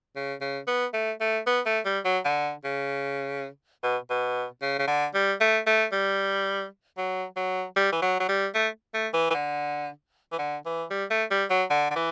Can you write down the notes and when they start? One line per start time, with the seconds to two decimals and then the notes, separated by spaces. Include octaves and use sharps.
0.16 C#3
0.41 C#3
0.68 B3
0.94 A3
1.21 A3
1.47 B3
1.66 A3
1.85 G3
2.05 F#3
2.25 D3
2.65 C#3
3.83 B2
4.10 B2
4.62 C#3
4.79 C#3
4.88 D3
5.14 G3
5.41 A3
5.67 A3
5.92 G3
6.98 F#3
7.37 F#3
7.76 G3
7.93 E3
8.02 F#3
8.20 F#3
8.29 G3
8.55 A3
8.94 A3
9.14 E3
9.30 E3
9.34 D3
10.32 E3
10.39 D3
10.66 E3
10.91 G3
11.10 A3
11.31 G3
11.50 F#3
11.70 D3
11.91 D3
11.96 E3